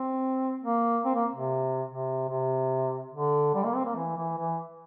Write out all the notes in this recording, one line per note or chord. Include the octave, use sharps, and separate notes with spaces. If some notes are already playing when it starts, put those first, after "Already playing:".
Already playing: C4
A#3
C4
A#3
C3
C3
C3
D3
G3
A#3
C4
A#3
E3
E3
E3